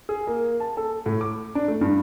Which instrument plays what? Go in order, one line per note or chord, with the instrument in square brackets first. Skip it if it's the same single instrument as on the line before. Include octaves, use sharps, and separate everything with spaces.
[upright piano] G#4
A#3
A5
A4
A2
D6
D4
A3
G2